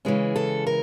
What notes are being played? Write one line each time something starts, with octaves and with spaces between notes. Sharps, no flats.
C#3 E3 G#3 C#4
A4
A#4